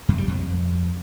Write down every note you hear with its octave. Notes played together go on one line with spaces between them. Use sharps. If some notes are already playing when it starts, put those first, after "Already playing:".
F#2
G3
F2